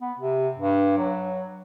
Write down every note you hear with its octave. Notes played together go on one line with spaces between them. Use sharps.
B3
C3
G2
F#3